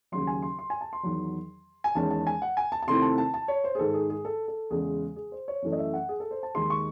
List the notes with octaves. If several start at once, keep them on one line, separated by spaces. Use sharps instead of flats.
D#2 C#3 F#3 C6
G#5
C6
C6
G#5
A5
C6
E2 D#3 F#3
G#5
E2 D#3 G#3 C#4 A5
A5
G#5
F#5
G#5
A5
A5
C3 D#3 A3 C4 E4 C6
A5
A5
A5
C#5
C5
G#4
G#2 D#3 G#3 A4
G#4
G#4
A4
A4
E2 C#3 G#3 G#4
G#4
C5
C#5
F#2 E3 A3
D#5
E5
F#5
G#4
A4
C5
A5
D#2 D#3 G#3 D#4 C6
C#6